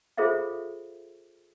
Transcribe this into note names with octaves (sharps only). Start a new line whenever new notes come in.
F4 G#4 A4 C5 E5 F5